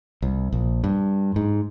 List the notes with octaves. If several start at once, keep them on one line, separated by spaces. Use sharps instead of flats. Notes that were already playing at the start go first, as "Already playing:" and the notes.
C2
A#1
G2
G#2